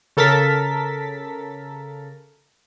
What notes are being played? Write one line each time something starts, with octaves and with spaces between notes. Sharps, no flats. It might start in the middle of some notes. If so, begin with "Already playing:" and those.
C#3 A4 A#4 A6 B6